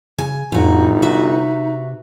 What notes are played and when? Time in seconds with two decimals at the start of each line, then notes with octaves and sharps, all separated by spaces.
0.18 C#3 G#5
0.52 G1 F2 A2 D#4 F#4
1.02 C3 F#4 B4 E5